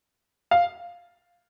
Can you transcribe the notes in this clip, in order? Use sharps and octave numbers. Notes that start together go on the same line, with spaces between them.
F5